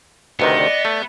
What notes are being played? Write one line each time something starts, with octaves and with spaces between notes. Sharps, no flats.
D2 C3 D#3 B3 B4 D#5
D5
A3